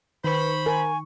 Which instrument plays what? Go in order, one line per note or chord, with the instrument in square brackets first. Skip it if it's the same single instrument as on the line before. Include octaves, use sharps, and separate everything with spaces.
[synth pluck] D#3 C#6 [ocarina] B4 [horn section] C5 B5
[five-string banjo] A#4 [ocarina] G#5